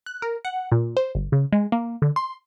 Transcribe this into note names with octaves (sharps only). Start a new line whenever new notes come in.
F#6
A#4
F#5
A#2
C5
G1
C#3
G#3
A#3
D3
C6